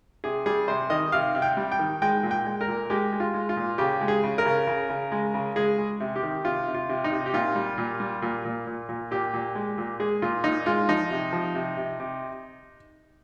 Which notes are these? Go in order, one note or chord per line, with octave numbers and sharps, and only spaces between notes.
C3 G#4
G3 G#4
C3 C5
D#3 D#5
C3 F5
C3
G5
G3
G5
D#3
G#3 G5
A#2
G5
G#3
A#4
A#2
G#3 G4
G#3
F4
G#3
F4
A#2
C#3 G4
G#3
G#4
C#3
A#4
C#3
C#3
C#3
G#3
C#3
G#3 G#4
G#3
C3
G4
D#3
C3 F4
C3
F4
C3
D#4
C3
G4
A#2 F4
G3
A#2
G3
A#2
A#2
A#2
A#2
A#2 G4
A#2
G#3
A#2
G#3 G#4
A#2 F4
A#2 D#4
G#3 F4
F3 D#4
C3
F3
C3
C3
C3